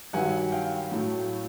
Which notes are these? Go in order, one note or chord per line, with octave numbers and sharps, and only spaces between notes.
G2 D#3 F#3 F#5 G#5
F5 G5
A2 F#3 A3